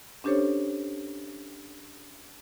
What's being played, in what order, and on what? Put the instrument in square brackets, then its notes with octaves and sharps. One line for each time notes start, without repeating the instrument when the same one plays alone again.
[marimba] C#4 D4 G4 A4 C5 C#5